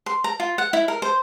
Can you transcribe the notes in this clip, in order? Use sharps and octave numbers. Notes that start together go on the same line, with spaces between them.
C6
A#5
F4
F#5
E4
A#4
C5